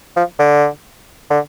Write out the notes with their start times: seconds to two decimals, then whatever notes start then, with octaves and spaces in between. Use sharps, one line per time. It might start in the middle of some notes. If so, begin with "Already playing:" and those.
0.16 F3
0.39 D3
1.30 D3